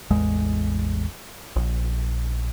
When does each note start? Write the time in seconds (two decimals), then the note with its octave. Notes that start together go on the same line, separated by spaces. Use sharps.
0.10 A1 E2 G#3
1.56 A#1